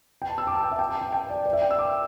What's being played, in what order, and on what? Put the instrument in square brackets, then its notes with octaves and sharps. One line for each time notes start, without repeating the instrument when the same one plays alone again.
[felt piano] G5
A5
E6
D6
A5
G5
E5
G5
A5
G5
G5
D5
D5
E5
G5
E6
D6